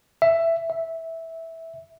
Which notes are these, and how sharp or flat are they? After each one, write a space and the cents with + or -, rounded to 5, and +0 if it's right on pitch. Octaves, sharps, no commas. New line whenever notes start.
E5 +10
E5 -10